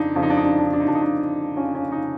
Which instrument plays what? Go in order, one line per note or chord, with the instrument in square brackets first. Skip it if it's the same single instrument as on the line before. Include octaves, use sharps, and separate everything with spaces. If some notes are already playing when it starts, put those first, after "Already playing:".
Already playing: [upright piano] F2 C#3 F3 D4 D#4
F2 C#3 F3 D4
D#4
D4
D#4
D4
D#4
D4
D#4
D4
D#4
F2 C#3 F3 D4
D#4
D4
F2 C#3 F3 C#4
C#4
D#4